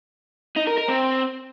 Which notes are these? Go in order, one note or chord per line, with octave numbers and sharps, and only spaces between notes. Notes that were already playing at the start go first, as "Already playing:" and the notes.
D#4
A#4
A#4
C4